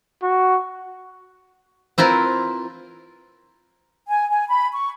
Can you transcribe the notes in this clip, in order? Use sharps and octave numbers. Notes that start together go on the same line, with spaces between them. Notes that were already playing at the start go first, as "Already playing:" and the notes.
F#4
C4 E4 F4 A#4 B4
G#5
G#5
B5
C#6